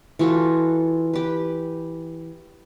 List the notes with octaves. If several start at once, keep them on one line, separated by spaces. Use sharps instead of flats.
E3 F4 F#4 A4
G4 B4